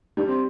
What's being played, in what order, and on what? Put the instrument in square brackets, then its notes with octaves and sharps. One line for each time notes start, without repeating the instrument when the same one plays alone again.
[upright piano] G3 [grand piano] D4
[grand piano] C4